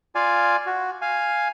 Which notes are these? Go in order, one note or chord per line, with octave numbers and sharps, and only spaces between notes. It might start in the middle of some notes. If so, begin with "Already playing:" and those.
F4 D5 F5 G#5
F#4
F5 G#5